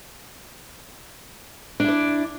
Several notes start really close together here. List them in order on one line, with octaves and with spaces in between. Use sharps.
D4 E4 D5